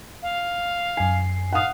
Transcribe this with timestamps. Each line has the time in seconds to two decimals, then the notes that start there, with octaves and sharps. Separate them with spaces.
0.22 F5
0.97 F#2 G#5 C7
1.53 F5 F#5 D#6